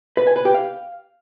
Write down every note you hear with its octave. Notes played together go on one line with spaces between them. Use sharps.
B4
G#5
B4
G4
F5